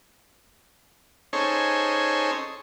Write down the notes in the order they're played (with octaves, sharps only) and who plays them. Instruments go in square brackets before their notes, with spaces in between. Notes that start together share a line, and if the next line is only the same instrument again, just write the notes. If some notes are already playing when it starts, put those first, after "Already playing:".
[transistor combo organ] C#4 D#4 G#4 A4 C5 C#5